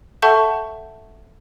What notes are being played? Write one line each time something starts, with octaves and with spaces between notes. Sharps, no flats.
A4 E5 F#5 A5 C#6 G6